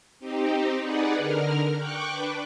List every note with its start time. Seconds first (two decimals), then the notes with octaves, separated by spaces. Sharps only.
0.20 C4 D#4 G4
0.81 D#4 G#4 B4 D5 F#5
1.17 D3 A#4 F6
1.76 G5 C#6 D6 F#6
2.10 D4 B4